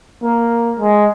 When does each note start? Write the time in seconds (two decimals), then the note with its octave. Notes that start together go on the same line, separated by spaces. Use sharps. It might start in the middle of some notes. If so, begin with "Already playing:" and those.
0.22 A#3
0.80 G#3